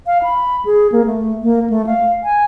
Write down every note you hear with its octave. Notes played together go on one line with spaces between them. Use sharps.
F5
B5
G#4
A#3
A3
A#3
A3
F5
G#5